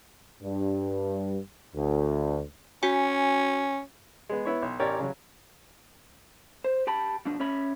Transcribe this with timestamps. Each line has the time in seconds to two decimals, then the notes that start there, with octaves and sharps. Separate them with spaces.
0.43 G2
1.75 D2
2.83 C#4 F#4 G#5
4.29 G#3 B3
4.46 B3 E4 C#5
4.62 B1
4.80 A1 G4 A#4 C#5 D5
4.99 C#3 F#3
6.64 C5
6.87 G4 G5 A5 B5
7.25 B2 F3 D4
7.40 C#4 C#5 E5 B5